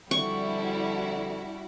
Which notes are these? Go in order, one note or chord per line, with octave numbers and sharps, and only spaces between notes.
F2 D3 G3 D4 E4 F#4 C#6